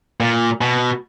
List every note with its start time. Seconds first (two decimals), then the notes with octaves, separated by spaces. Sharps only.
0.20 A#2
0.61 B2